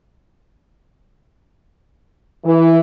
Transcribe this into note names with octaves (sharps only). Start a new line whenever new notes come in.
E3